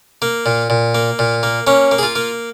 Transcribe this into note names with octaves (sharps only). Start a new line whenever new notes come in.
A#3
A#2
A#2
A#3
A#2
A#3
A#3 C#4
A#3
G#4
F4
A#3